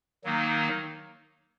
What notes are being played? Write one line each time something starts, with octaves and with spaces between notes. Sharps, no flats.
D#3 F#3 A#3 D#4